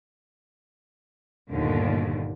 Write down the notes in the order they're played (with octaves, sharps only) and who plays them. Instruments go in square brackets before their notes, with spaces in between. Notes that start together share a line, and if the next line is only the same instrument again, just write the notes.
[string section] G1 D#2 A#2 D3